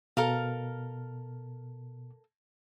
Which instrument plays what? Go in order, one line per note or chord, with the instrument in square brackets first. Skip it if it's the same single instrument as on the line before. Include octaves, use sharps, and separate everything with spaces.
[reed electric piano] B2 [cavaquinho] A4 A#4 F5